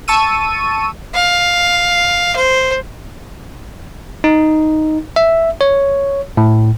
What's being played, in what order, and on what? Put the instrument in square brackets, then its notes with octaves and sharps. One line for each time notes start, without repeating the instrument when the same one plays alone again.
[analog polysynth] A5 C#6 E6 D#7
[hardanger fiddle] F5
C5
[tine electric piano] D#4
E5
C#5
A2